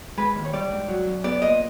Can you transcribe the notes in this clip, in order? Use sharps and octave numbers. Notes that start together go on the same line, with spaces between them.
G#3 B4
D#2
C#5
G3 D5
G#2
F#3
F#2
B3 D5
A#2 D#5